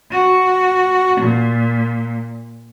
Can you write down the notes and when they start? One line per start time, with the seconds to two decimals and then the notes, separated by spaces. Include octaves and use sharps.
0.11 F#4
1.21 A#2